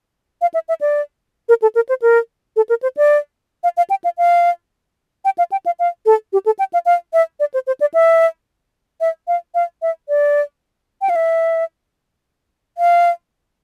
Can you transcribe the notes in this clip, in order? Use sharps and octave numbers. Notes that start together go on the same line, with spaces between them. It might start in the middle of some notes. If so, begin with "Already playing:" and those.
F5
E5
E5
D5
A#4
A4
A#4
C5
A#4
A4
A#4
C5
D5
F5
F5
G5
F5
F5
G5
F5
G5
F5
F5
A4
G4
A4
G5
F5
F5
E5
D5
C5
C5
D5
E5
E5
F5
F5
E5
D5
G5
F5
E5
F5